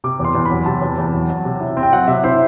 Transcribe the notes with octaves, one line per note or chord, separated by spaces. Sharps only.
C3 D6
E2 C6
E2
B5
F#3
C3 A5
E2
E2
F#3
F#3
C3
E4
C4
G5
F#3 F#5
C3 E5
E4 C5